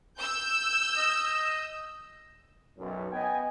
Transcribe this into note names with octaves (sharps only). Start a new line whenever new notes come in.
E6 G6
D#5
B1 F#2
B3 D#5 G5 G#5